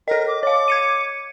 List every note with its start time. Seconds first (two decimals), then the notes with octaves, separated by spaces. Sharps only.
0.08 A4 A#4 D#5
0.28 D6
0.43 C#5 F5 D6
0.68 G#6 C#7 D#7